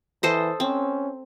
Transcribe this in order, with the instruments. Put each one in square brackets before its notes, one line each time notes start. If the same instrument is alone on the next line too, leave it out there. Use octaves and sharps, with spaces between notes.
[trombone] E3 [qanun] A4 C5 D#5
[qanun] C4 [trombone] C#4